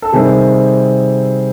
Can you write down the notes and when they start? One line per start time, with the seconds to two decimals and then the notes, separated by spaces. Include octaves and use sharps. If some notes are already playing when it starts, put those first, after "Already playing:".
0.02 A4
0.13 C3 D#3 G3 C4 G#4